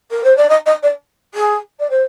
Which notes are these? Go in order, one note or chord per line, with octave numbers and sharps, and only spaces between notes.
A#4
C5
D5
D#5
D#5
D5
G#4
D5
C5